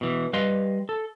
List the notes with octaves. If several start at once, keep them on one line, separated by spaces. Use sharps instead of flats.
B2 E3
G3 B4 D#5 F5 C6
A4